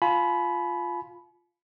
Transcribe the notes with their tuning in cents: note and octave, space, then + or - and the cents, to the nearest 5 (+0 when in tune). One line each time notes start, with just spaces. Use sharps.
F4 +0 G#5 +45 B5 +0